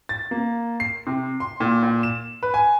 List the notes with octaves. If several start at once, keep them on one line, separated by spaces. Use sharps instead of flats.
A6
A#3
C7
C3
C6
A#2
A#2
E7
B4
G#5